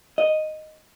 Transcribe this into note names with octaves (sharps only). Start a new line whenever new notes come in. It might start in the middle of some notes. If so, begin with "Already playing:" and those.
D#5